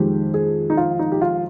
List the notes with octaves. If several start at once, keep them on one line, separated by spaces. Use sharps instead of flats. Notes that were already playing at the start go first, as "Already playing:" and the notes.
Already playing: F2 D#3 G#3 G4
G#4
D#4
F4
D#4
G4
F4